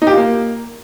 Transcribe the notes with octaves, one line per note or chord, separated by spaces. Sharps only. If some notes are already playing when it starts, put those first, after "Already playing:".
D#4
G4
F4
A#3